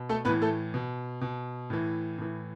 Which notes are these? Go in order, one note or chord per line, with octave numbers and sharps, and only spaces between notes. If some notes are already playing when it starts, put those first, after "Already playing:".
Already playing: B2
A3 A4
A2 E3 B3 B4
A3 A4
B2
B2
A2 E3
A2 E3